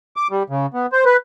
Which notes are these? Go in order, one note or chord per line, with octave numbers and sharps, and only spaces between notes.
D6
G3
C#3
B3
C5
B4